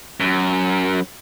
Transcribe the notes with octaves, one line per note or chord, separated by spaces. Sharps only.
F#2